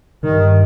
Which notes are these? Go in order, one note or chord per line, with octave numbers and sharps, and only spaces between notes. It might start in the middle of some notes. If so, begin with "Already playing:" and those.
G2 D#3